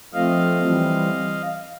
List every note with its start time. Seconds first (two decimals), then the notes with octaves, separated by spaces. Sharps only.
0.14 F3 A3 C4 D#5 F5
0.61 E3 G3 C4